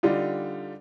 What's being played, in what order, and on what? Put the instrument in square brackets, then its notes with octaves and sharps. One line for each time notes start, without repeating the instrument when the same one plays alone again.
[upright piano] D3 G3 D#4 F4